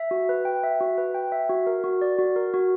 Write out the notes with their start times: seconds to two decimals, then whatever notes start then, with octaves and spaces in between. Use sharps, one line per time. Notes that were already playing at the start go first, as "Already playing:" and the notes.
Already playing: E5
0.11 F#4
0.29 B4
0.45 G5
0.63 E5
0.81 F#4
0.98 B4
1.15 G5
1.32 E5
1.49 F#4
1.67 A#4
1.84 F#4
2.02 D5
2.19 F#4
2.36 A#4
2.54 F#4